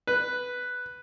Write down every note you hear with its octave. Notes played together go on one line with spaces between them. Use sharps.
B4